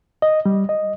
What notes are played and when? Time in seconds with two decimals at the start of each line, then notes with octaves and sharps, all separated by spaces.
0.22 D#5
0.46 G3
0.69 D#5